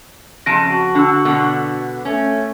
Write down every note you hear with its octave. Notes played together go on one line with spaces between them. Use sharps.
F2 C#3 A5 A#6 D7 D#7
F#4
D3 D4 E6
B2 D3 B3
A3 C#4